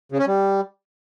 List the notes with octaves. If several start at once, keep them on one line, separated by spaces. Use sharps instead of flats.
C#3
C#4
G3